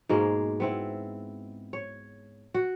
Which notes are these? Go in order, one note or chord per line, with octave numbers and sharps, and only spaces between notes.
G#2 B2 G#3 A#3
B3 C4 E4
C#5
F#4